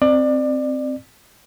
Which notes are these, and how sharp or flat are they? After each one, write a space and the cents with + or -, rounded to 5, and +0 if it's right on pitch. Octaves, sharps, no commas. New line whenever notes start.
C4 +0 D5 +25